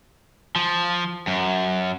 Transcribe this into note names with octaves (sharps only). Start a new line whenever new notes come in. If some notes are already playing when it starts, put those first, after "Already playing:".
F3
F#2